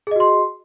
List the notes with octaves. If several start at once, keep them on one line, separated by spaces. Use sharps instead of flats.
F#4 G#4 D#5 C6